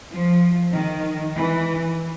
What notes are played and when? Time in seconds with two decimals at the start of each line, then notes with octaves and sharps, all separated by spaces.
0.10 F3
0.72 D#3
1.35 E3